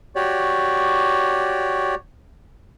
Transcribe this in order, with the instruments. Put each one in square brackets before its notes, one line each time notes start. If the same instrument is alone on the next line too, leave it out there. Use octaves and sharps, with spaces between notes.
[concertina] F#4 G4 C#5 D5